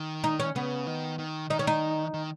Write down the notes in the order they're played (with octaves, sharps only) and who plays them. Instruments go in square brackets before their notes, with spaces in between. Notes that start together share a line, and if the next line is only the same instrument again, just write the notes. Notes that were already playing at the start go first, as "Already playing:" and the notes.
Already playing: [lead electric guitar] D#3
[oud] D#4
C#4
[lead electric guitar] C#3 [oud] B3
[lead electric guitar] D#3
D#3
[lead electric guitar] D#3 [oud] D#4
[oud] C#4
D#4
[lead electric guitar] D#3